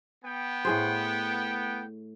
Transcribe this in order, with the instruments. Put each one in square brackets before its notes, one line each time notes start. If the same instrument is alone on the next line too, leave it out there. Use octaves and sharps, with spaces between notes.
[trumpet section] B3 G5
[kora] A2 G#4 C5